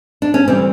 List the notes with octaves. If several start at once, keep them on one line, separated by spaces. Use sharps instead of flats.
D4
C#4
D2 C3 E3 G3 C4